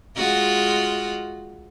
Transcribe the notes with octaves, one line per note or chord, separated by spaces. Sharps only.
G#3 F4 F#4